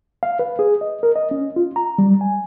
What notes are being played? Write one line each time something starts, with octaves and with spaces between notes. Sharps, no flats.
F5
B4
G#4
D#5
A#4
D#5
C#4
F4
A#5
G3
G#5